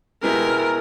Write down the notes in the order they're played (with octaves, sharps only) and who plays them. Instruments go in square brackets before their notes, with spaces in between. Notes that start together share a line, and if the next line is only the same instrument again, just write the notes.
[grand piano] B2 G#3 B3 E4 G4 [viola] A#4